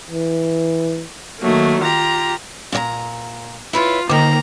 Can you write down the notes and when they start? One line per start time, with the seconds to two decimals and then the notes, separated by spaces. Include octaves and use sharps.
0.10 E3
1.40 D#3 F#3 A3 A#3
1.82 F4 G4 A#5
2.72 A#2 D5 A#5
3.73 E4 F4 B4 C#5
4.10 D#2 D3 D#3 A#3 A#5